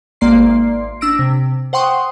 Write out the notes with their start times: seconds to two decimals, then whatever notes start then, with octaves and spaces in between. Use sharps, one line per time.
0.21 G#1 A#3 D5 C6 C7
1.01 D4 E6 A#6 D7
1.19 C3
1.73 C5 F#5 G5 C6 C#6 D#6